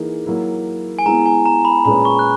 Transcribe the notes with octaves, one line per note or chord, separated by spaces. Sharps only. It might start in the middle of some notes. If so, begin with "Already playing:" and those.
Already playing: E3 A#3 D#4 G#4
F#3 A#3 E4
G#5
G#3 B3 E4 A#5
G#5
A#5
B5
A#2 G#3 C#4 G#4 B4 B5
C#6
F#6